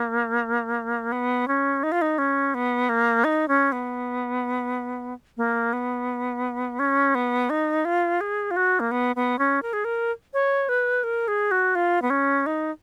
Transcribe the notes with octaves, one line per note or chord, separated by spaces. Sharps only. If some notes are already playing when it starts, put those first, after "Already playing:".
Already playing: A#3
B3
C#4
D#4
F4
D#4
C#4
B3
A#3
D#4
C#4
B3
A#3
B3
C#4
B3
D#4
F4
G#4
F4
F#4
A#3
B3
B3
C#4
A#4
G#4
A#4
C#5
B4
A#4
G#4
F#4
F4
B3
C#4
D#4